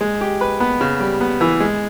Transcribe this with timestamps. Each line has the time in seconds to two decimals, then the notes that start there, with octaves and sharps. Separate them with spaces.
0.01 G#3
0.21 G4
0.41 B4
0.60 B3
0.81 C#3
1.00 G3
1.21 B3
1.41 E3
1.60 G#3